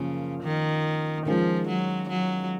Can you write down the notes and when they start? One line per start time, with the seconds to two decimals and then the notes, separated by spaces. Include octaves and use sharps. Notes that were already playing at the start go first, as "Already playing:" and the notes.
Already playing: F#2 C#3 F3 A#3 F4
0.43 D#3
1.26 D#3 F3 G#3 C#4 F4 G#4
1.68 F#3
2.09 F#3